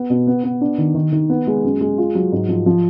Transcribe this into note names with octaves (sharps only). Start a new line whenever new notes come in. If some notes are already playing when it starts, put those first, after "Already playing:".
Already playing: B3
B2
B3
B3
D4
D#3
D#3
D#3
B3
G#3
F#2
G#3
F4
F#3
G#2
F3
F3